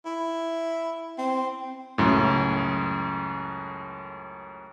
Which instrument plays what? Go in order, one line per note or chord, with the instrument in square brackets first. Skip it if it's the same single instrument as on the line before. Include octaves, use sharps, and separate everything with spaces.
[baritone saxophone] E4
C4
[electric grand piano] C#2 F#2 A2